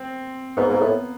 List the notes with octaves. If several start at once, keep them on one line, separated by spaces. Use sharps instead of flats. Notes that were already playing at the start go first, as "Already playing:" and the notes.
Already playing: C4
G#2 B3
G#2 A#3
A2 B3